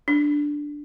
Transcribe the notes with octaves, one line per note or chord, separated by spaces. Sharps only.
D4